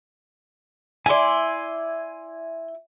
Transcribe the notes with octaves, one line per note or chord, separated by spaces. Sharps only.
E4 D5 G#5 C6